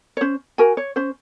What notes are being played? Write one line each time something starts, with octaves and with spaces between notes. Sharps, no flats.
C#5
C#4 C5
F#4 A#4 G#5
C#5
C#4 C5